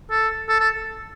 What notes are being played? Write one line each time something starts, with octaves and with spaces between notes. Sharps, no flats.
A4
A4
A4